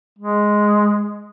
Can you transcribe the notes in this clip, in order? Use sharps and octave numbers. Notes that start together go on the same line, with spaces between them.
G#3